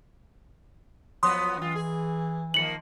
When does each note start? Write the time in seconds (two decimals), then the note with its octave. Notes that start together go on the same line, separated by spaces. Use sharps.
1.23 F3 F#3 B3 C6 D#6
1.57 F#2 E3 F4
1.75 G#4
2.54 D#3 F3 A#3 C#7 F#7